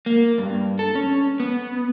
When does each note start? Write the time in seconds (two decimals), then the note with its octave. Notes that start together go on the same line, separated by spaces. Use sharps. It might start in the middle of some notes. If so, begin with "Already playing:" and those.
0.06 A#3
0.38 G2
0.79 A4
0.95 C#4
1.40 B3